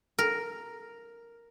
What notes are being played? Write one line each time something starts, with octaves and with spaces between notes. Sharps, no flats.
A#4